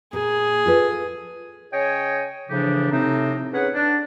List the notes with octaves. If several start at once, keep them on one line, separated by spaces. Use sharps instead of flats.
A#2 G#4
F4 A4 B4
C#3 C#5 D#5 G5 G#5
A2 C#3 E3 F3 D4 G4
A2 C3 C4 D#4
C#4 G#4 B4 C#5 F#5
D4